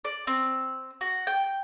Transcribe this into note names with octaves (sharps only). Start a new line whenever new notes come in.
D5
C4
F#4
G5